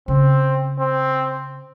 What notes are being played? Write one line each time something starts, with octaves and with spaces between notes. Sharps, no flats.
C#3 C4
C4